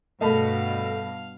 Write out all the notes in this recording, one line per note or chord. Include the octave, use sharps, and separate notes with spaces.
G2 B2 A3 D#5 F5 A5 B5